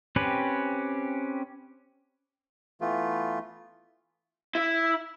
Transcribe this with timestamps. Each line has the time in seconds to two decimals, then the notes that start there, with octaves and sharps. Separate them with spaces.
0.16 C4 C#4 G4 B4
2.81 E3 A3 B3 F4
4.55 E4